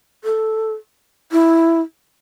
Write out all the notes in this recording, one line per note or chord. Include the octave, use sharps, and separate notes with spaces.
A4
E4